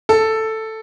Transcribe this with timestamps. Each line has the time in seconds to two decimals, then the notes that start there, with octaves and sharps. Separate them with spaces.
0.09 A4